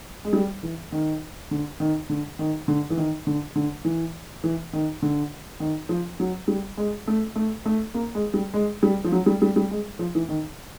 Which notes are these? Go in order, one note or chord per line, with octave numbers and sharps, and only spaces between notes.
G#3
G3
E3
D#3
D3
D#3
D3
D#3
D3
E3
D#3
D3
D3
E3
E3
D#3
D3
D#3
F3
F#3
G3
G#3
A3
A3
A3
A#3
G#3
G3
G#3
G3
F3
F#3
G3
G3
G3
G#3
F3
E3
D#3